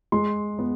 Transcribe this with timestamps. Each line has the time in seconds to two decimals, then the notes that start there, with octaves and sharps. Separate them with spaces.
0.12 G#3 C6
0.59 B3